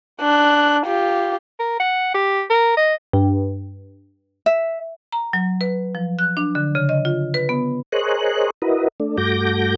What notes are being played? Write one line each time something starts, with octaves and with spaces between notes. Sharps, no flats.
D4 F#6
F4 G4
A#4
F#5
G4
A#4
D#5
G2
E5
A#5
F#3
B4
F3
F#6
D4
D3
C#3
D#5
F4
B4
B3
G#4 A#4 C5 C#5 D#5 F#6
E4 F#4 A#4 B4 D#5
A3 D4
G2 A3 F#4 D6 G6 A#6